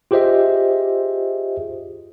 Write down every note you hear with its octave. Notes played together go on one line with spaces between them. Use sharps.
F4 G4 G#4 C5 D#5 E5